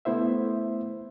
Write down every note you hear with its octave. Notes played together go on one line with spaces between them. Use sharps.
A3 B3 E4 C5 E5